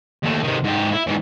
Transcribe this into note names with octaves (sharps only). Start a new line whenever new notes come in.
D#2 A3
C3 D#3
G#2 G4
E4
G#2 E3